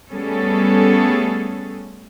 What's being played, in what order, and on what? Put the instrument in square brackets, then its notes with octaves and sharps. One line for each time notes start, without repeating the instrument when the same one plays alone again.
[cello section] G3 A3 B3 C#4 G#4 A4